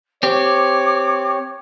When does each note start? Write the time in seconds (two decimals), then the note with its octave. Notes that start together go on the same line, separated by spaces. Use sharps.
0.23 C4 G4 C#5 D6